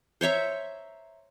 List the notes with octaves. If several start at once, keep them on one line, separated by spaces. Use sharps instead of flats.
C5 C#5 E5 A#5